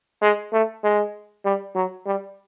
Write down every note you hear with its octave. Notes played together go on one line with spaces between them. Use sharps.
G#3
A3
G#3
G3
F#3
G3